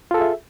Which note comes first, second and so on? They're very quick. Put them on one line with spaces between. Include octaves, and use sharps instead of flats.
F4 A4 G#4 E5